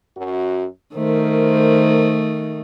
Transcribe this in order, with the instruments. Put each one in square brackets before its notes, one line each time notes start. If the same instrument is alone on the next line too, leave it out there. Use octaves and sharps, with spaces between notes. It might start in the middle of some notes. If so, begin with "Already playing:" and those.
[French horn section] F#2 F#4
[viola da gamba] D#3 A3 [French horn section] A#4 C5